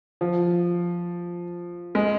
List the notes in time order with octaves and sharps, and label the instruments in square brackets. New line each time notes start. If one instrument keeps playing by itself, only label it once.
[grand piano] F3
G#3